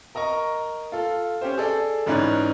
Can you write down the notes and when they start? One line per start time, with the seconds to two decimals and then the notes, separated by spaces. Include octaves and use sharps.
0.15 A#4 D#5 A#5 C#6
0.92 F4 A4
1.41 C#4 G4 C5
1.58 G#4 A4 D5
2.06 A1 G#2 C#4 D5 B5 F#6